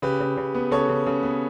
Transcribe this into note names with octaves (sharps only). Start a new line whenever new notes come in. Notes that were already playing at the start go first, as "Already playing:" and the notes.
C#3 G4 B4
C#3
C#3
B3
C#3 A4 C#5
C#3
C#3
B3